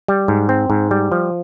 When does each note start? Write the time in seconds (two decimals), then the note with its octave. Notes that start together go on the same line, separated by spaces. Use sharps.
0.08 G3
0.28 G#2
0.49 C4
0.70 G#2
0.91 G3
1.12 F3